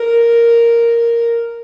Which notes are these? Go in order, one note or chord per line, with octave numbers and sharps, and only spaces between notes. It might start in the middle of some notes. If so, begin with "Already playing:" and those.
Already playing: A#4